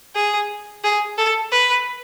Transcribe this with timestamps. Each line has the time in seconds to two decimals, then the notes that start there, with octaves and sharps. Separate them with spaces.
0.15 G#4
0.84 G#4
1.18 A4
1.52 B4